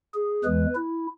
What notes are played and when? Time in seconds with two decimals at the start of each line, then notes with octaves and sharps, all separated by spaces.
0.14 G#4
0.44 E2 E3 G#3 B4
0.75 E4